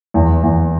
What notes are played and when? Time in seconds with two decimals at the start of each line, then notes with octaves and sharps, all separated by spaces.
0.14 E2
0.43 E2